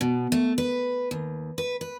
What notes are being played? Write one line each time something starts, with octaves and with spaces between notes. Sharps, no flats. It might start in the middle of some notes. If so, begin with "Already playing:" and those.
B2
A3
B4
D#2
B4
B4